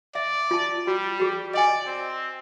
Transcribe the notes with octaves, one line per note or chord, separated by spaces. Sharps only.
D5 E5
F4 A5
G3 F#4
F#4 G#4
D5 D#5 G#5
C4